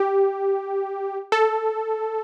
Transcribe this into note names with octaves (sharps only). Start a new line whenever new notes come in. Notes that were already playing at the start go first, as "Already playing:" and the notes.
Already playing: G4
A4